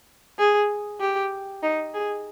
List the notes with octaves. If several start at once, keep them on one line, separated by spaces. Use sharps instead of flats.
G#4
G4
D#4
G#4